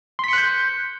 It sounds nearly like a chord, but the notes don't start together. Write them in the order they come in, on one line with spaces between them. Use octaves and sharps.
C6 B6 C#7 F#6 G6